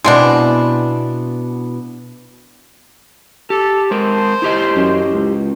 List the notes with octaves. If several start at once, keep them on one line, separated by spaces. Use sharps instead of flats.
B2 G#3 B3 C4 D4 E4
G4 A4
G#3 A#4 C5
E4 G4 D#5
F#2
C#2